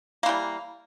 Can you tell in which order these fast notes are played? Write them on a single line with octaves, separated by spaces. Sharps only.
A#3 E3 G3